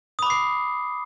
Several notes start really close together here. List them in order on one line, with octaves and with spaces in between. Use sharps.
D#6 B5 D6 C7